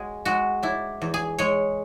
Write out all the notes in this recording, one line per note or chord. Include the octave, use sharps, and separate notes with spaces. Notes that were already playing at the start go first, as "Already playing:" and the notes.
Already playing: G#3 F#4 G#4
G#3 F#4
D4 E4
E2
G#4
G#3 C#5